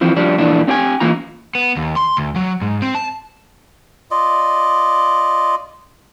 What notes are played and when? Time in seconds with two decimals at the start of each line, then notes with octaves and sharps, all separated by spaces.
0.01 E3 F3 C4
0.16 F3 G3 D4
0.38 F2 A#2 E3 D4
0.68 C4 D4 G4 G5 G#5
1.00 E3 A#3 F4 A#5
1.55 B3
1.77 D#2
1.96 C6
2.17 D2
2.36 F#3
2.62 G#2
2.82 C4
2.95 A5
4.11 F4 D5 D#5